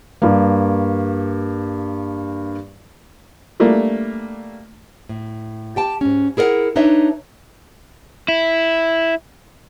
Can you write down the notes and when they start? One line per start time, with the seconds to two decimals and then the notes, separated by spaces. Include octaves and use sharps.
0.22 G2 A#3
3.60 G3 A3 A#3 D4
5.09 A2
5.76 G4 G5 A5
6.01 G#2 C#4
6.37 E4 G#4 A#4 D5 F#5
6.76 D4 D#4 B4 C#5 E5
8.28 E4